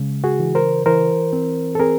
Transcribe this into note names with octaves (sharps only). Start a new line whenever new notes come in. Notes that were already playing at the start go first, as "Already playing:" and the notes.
Already playing: C#3 G#3
F#4 G#4
E3
A#4 C5
E3 A#4 C5
C4
A4
C4 G#4 A#4